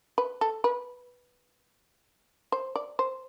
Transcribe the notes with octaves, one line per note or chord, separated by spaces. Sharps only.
B4
A4
B4
C5
D5
C5